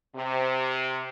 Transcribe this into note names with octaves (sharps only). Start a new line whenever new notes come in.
C3